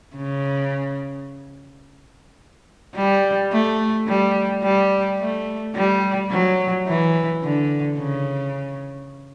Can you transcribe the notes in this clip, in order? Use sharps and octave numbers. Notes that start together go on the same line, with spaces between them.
C#3
G3
A3
G3
G3
A3
G3
F#3
E3
D3
C#3